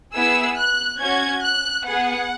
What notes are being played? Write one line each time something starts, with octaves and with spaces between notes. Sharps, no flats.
B3 E4 G#4 E6
F#6
C#4 F#4 G#6
F#6
B3 G#4 F#5